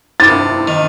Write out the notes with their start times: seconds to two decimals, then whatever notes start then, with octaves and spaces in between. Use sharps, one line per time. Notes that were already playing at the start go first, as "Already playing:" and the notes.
0.20 C3 A6
0.68 D#3